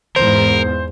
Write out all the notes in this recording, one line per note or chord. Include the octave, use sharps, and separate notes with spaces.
E2 G#2 A#4 C5